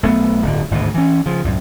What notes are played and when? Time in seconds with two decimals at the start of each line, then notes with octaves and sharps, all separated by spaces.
0.03 B1 A3 B3
0.42 D1 G1 D3
0.71 G#1 D2 G2 B2
0.94 E3 C#4
1.26 C#3 F3
1.44 C2 F#2 A2